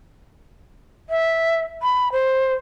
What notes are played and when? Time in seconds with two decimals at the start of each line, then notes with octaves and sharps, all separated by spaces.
1.10 E5
1.82 B5
2.12 C5